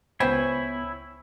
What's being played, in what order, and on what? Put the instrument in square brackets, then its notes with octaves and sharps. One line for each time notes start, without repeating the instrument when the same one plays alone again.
[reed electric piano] C#2 B3 B5 [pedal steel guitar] E4 C#5 G#5 [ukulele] C5 G5